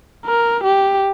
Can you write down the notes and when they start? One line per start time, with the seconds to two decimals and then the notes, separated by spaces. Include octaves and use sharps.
0.26 A#4
0.64 G4